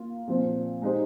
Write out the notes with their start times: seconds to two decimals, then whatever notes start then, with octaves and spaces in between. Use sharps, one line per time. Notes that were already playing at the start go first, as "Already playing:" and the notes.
Already playing: A#3 F4
0.27 A#2 F3 C4
0.82 G#3 D#4 G4 C5